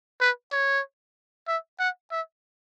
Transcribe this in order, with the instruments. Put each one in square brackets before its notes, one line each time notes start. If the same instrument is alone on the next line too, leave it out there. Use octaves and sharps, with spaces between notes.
[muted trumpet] B4
C#5
E5
F#5
E5